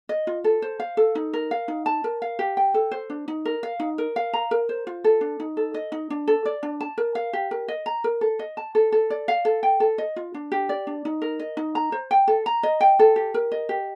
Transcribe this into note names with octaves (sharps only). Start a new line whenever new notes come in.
D#5
F4
A4
C5
F5
A4
D#4
A#4
F5
D#4
A5
A#4
F5
G4
G5
A4
C5
D4
D#4
A#4
F5
D#4
A#4
F5
A#5
A#4
C5
F4
A4
D4
D#4
A4
D#5
D#4
D4
A4
D5
D4
A5
A#4
F5
G4
A#4
D#5
A#5
A#4
A4
D#5
A5
A4
A4
D5
F5
A4
G5
A4
D#5
F4
D4
G4
D5
D4
D#4
A#4
D#5
D#4
A#5
C5
G5
A4
A#5
D#5
G5
A4
G4
A#4
D#5
G4